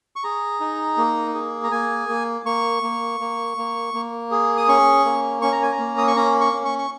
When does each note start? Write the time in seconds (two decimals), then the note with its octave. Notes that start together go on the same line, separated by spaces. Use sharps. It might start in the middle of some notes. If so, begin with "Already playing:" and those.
0.16 C#6
0.24 G#4 A#5
0.60 D#4
0.98 A#3
1.34 G#4
1.64 A#5
1.72 A#3 G#5
2.09 A#3
2.45 A#3 C#6
2.83 A#3
3.20 A#3
3.58 A#3
3.94 A#3
4.31 G#4
4.57 D#6
4.68 C#4 C#6
5.05 A#3
5.42 C#4 C#6
5.52 A#5
5.62 G#5
5.72 A#5
5.79 A#3
5.98 D#6
6.07 C#6
6.16 C#4 A#5
6.41 C#6
6.53 C#4
6.65 C#6
6.78 C#6